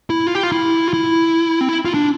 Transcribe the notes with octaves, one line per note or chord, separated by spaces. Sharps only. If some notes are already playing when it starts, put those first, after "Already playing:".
E4
F4
G4
F4
E4
F4
E4
C4
E4
F4
D4